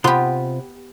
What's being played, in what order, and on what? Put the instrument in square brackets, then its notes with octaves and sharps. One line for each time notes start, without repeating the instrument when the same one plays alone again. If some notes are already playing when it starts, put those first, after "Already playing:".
[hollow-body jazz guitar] C3 F4 C6 [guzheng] B3 G4